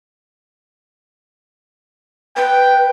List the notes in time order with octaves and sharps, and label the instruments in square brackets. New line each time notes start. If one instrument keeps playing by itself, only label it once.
[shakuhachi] B4 [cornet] G5